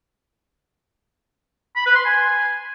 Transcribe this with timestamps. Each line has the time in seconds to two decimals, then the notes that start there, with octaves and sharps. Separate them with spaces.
1.76 B5
1.86 B4
1.96 C6
2.05 G#5